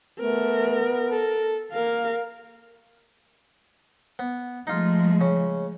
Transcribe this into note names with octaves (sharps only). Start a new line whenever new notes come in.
A3 B3 A#4
A4
A#3 A#4 F5
B3
F3 G#3 A3 D#4 F4
C#3